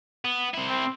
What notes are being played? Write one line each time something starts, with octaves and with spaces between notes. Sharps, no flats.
B3
C3 E4
C4